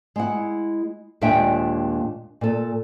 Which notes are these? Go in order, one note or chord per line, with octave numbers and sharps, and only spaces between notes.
G#3 E4 F#5
D#2 A#2 G#3 D4 E5 G5
A#2 A4